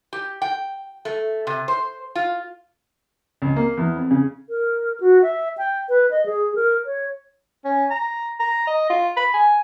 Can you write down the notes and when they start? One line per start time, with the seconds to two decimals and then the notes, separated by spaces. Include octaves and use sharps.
0.13 G4
0.42 G5
1.05 A3
1.47 C3
1.68 C5
2.15 F4
3.42 C#2
3.56 A#3
3.77 E2
3.95 F2
4.11 C#3
4.50 A#4
5.01 F#4
5.22 E5
5.58 G5
5.89 B4
6.11 D#5
6.26 G#4
6.55 A#4
6.86 C#5
7.65 C#4
7.91 A#5
8.40 A#5
8.67 D#5
8.90 F4
9.17 B5
9.34 G#5